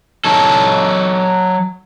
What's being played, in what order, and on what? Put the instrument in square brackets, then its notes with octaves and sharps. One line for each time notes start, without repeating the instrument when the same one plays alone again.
[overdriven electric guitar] F#3 A4